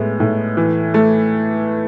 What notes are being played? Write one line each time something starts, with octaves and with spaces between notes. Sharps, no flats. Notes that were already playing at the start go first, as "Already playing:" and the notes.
Already playing: A2 G#3 B3
A2
E3
A3